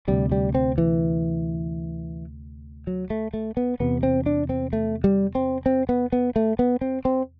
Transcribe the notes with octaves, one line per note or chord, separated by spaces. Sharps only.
D2 C3 G3
G3
C4
E3
F#3
A3
A3
B3
E2 C3 B3
C4
D4
C4
A3
G3
C4
C4
B3
B3
A3
B3
C4
C4